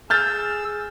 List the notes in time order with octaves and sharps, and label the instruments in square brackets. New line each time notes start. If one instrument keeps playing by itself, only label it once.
[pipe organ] G#4 E6 [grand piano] F6 G6 A6